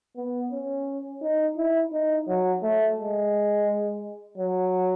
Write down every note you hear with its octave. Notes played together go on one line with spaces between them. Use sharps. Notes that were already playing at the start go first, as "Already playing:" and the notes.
B3
C#4
D#4
E4
D#4
F#3
A3
G#3
F#3